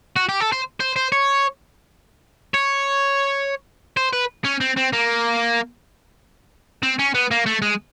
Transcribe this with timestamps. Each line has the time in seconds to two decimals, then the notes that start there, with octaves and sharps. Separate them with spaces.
0.16 F#4
0.29 G4
0.40 A4
0.52 C5
0.80 C5
0.96 C5
1.12 C#5
2.54 C#5
3.97 C5
4.13 B4
4.45 C#4
4.60 C4
4.77 C4
4.93 A#3
6.83 C4
6.99 C#4
7.14 B3
7.31 A#3
7.46 A3
7.62 G#3